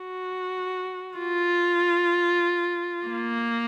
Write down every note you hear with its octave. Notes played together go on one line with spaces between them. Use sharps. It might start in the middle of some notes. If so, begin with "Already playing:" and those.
Already playing: F#4
F4
A#3